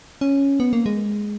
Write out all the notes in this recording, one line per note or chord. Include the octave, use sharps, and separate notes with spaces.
C#4
B3
A#3
G#3